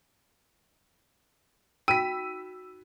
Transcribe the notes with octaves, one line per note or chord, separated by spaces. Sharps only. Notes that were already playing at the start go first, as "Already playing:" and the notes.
D#4 F#4 G5 B5 E6 B6 D#7